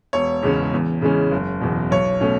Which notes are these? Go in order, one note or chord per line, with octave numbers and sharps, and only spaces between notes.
E1 C#5
E2 C#3 G#3 C#4
E2
C#3 E3 G#3 C#4
F#1
E2 B2
B1 C#5
B2 A3 C#4